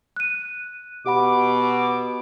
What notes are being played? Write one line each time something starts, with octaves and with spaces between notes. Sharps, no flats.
F#6 D#7
B2 G4 F#5 B5 D6